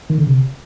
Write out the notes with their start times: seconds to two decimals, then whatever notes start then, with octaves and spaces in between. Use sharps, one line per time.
0.10 D#3
0.18 D3
0.27 C3